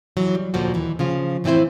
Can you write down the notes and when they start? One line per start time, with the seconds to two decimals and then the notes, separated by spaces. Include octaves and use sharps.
0.17 E3 F#3
0.35 G3
0.54 D2 A#2 F3 F#4
0.74 D#2 E3
0.99 C#3 F3 F4
1.44 A2 E3 C4 E4 C5